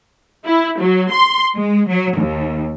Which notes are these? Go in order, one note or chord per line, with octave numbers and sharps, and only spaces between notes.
E4
F#3
C6
G#3
F#3
D#2